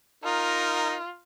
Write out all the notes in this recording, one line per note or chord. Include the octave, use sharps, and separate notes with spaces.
D#4 F4 A#4